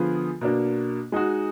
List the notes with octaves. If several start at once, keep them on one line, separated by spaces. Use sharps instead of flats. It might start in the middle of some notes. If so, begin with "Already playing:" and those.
Already playing: D3 F3 B3 F4 G#4
B2 A#3 D4
G#3 D#4 F#4